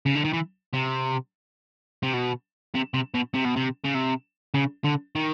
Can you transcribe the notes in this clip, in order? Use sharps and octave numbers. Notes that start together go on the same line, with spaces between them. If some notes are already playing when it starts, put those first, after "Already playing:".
C#3
D3
D#3
E3
C3
C3
B2
C3
C3
B2
C3
B2
C3
C#3
C3
C#3
D3
D#3